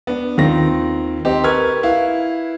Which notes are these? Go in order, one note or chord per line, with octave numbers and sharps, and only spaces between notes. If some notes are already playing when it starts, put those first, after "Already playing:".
B3 D4
D#2 D#3 C4 F4 A#6
C4 D#4 G4
A#4 B4 C#6 F6 G#6
E4 B4 F5